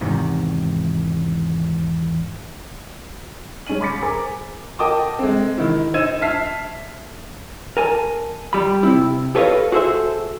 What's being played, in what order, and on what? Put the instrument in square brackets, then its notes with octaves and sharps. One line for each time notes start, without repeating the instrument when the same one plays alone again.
[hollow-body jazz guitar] E2 G#2 C3 D#3
[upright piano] G#3 C#4 D#4 D#7 F#7
B5 C6 D6 A6 B6 C#7
G#4 A#4 C5 G#5 A#5 D6
[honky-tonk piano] A#4 D#5 G5 A5 D6 D#6
G#3 C4
D#3 E4
D#4 C5 E6 G#6 D#7 E7
E5 A5 F6 B6 C7
[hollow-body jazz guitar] A#4 G#5 A5
G3 B5
C3 C4 E4
G4 A4 B4 C#5 D#5 F5
F#4 G#4 A4 C5 E5